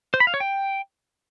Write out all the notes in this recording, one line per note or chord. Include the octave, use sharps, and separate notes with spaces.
C5
B5
F5
C#5
G5